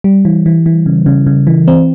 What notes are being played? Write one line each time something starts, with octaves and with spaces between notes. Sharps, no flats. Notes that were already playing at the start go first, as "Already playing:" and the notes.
G3
E3
E3
E3
C#3
C#3
C#3
E3
C4